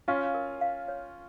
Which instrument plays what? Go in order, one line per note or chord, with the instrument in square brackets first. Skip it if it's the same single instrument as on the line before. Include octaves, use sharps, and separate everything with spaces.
[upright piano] C#4 F4 [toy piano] F5
[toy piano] A#4
F5
C#5